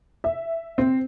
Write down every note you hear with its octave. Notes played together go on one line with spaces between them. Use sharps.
E5
C4